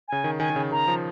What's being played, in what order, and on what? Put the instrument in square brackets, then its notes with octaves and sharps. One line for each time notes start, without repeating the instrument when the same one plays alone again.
[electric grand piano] C#3 [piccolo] G#5
[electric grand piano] D#3
[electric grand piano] D#3 [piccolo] G#5
[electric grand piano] D#3
C#3
[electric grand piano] D#3 [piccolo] A#5
[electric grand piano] F3